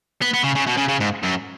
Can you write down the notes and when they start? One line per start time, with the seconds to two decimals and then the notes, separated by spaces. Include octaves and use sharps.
0.22 B3
0.34 B3
0.44 C#3
0.56 C#3
0.67 B2
0.77 C#3
0.89 C#3
1.00 G#2
1.23 F#2